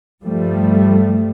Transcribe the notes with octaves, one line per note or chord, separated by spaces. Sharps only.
G2 F3 G3 A3